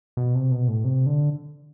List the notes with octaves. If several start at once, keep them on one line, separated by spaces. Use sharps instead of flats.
B2
C3
B2
A2
C3
D3